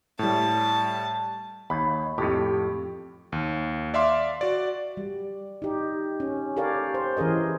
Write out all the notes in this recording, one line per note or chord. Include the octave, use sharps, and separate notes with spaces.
A2 G3 A5
D#2 B5
F2 A2 G4
D#2
D5 E5 F5 C6 D6
F#4 D5
G3
D#4 G4
C#4
G4 A4 A#4 C#5 D5 F5
C5
E3 C#4 G#4 A#4 D#5